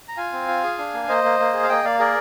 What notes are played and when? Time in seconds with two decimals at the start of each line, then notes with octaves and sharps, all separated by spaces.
0.08 A#5
0.17 F4 F5 G#5
0.32 C4
0.48 F4
0.64 G#4
0.78 D4
0.94 A#3
1.09 A#3 C5 D#5
1.24 A#3
1.39 A#3
1.53 G#4
1.63 F5
1.69 A#3 D#5 G5
1.84 A#3 D5 F5
1.99 G#4 A#4 D5